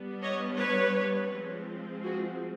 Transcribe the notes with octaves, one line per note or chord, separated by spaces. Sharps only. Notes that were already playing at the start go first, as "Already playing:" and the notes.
Already playing: G3 B3 D4
C#5 D#5
B4 C#5
F3 G#3 C4
F#4 G#4